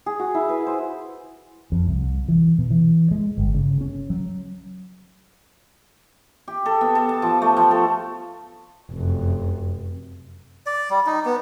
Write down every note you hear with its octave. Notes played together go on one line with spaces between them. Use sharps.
G#4
F#4
E4
B4
C5
F2
C2
E3
B2
E3
G#3
G1
C#3
C#4
F#3
G4
A4
B3
A4
A5
F3
A3
F3
A4
F1 F#2
D5
G3
D#4
B3